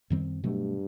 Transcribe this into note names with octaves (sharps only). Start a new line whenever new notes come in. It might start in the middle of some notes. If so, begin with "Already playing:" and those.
F#2 D#3 G3 C4
G2 B2 F#3 A3